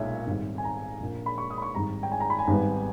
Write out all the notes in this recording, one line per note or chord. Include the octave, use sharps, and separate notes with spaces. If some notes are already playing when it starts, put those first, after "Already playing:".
Already playing: B1 A#2 G#3 D#4 C#5 E5
G#1 G#2 G3
G#5
A#5
A#1 A#2 A#3
B5
C#6
D#6
B5
C#6
G#1 G#2 G3 A#5
G5
G#5
A#5
B5
G#5
G#1 G#2 G3 B3